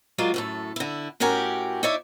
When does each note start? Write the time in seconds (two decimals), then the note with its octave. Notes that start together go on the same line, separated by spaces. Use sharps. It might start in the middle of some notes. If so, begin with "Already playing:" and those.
0.18 F#3 G#3 F4 A#4 D5
0.34 F#2 A2 A4
0.76 D3 E4
1.20 A2 C#4 F#4 G4 A#4 G#5
1.83 D#4 E4 C#5 D5 E5